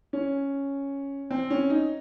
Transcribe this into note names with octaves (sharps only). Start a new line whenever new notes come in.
C#4
C4
C#4
D#4